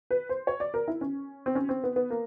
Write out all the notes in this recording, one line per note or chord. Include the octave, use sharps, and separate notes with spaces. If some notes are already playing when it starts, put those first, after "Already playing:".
B4
C5
C#5
D5
A#4
E4
C#4
C4
C#4
C4
B3
B3
A#3